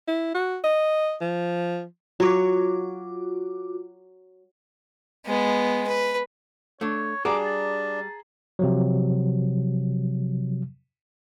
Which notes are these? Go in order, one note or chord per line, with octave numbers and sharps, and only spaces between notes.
E4
F#4
D#5
F3
F#3 F4 F#4 C#5 D6
G#3 B3
B4
A3 D4 C#5
G3 D4 F#4 G#4 A#5 D6
A5
C3 F3 F#3